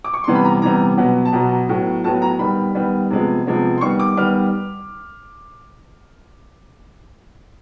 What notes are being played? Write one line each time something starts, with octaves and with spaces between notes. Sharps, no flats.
D6
C#6
C3 E3 G3 B3 C6
B5
A#5
C3 E3 G3 B3 A#5
B2 F#3 B3
A5
B2 F#3 B3 A#5
A2 F#3 B3
A2 F#3 B3 A5
A#5
D#3 G3 B3 B5
D#3 G3 B3
C3 F3 G#3 B3
C3 F3 G#3 B3
C6
D#3 G3 B3 C#6
D6
D#3 G3 B3 F6